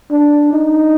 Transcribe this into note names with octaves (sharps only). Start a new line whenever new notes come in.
D4
D#4